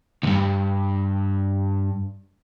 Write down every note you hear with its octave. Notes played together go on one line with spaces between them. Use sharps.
D2 G2